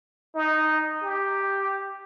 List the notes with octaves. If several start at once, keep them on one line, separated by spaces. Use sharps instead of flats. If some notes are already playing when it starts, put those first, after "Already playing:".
D#4
G4